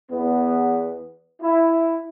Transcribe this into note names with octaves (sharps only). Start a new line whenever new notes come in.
E2 B3
E4